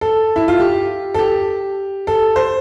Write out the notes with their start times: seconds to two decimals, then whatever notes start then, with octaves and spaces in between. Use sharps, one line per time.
0.01 A4
0.36 E4
0.48 F4
0.60 G4
1.14 A4
1.19 G4
2.07 A4
2.36 C5